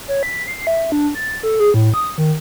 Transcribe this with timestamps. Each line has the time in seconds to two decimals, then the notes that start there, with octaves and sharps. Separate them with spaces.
0.08 C#5
0.23 B6
0.47 C7
0.67 E5
0.92 D4
1.15 A6
1.43 A4
1.60 G#4
1.74 A2
1.94 D#6
2.18 D#3